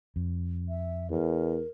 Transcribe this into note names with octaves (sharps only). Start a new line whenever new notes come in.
F2
E5
E2 A#4